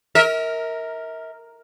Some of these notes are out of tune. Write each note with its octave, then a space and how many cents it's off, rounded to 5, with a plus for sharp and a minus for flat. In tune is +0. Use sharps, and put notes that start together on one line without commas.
A#4 -5 E5 -40